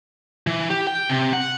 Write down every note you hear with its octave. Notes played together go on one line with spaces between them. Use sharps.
E3
G4
G5
C3
F#5